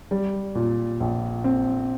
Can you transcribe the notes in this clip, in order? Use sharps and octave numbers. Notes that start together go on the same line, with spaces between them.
G3
A#2
A#1
C4